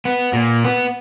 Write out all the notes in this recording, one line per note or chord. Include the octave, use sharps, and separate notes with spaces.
B3
A#2
B3